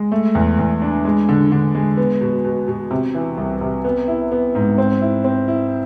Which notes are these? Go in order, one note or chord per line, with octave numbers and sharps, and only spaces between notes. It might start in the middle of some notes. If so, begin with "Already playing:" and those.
Already playing: G#3
A3
E2
E2
D4
G#3
D3
D3
G#3
B3
B2
B2
B2
C3
E3
C2
C3
B3
E4
B3
G#2
C4
E4
C4
E4